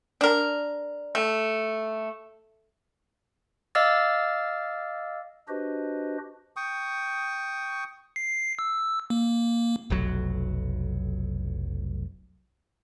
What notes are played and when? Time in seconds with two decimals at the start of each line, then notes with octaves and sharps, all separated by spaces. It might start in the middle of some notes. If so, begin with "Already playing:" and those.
0.21 D4 A#4
1.15 A3
3.75 D#5 F5 D6 E6 F6 A6
5.48 D4 F#4 G4 B4 C5 D#5
6.56 G5 C#6 D#6
8.16 C7
8.59 E6
9.10 A#3
9.90 F1 B1 F#3